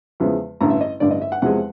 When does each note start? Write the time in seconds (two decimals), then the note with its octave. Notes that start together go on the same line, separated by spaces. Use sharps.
0.20 E2 C#3 F3 G#3 B3
0.61 A1 G2 D3 A#5
0.70 E5
0.81 D#5
1.00 A1 G2 D3 D5
1.11 D#5
1.22 E5
1.32 F#5
1.42 E2 C3 F3 G#3 F#5